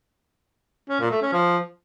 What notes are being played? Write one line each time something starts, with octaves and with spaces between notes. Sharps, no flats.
C#4
A#2
A3
C#4
F3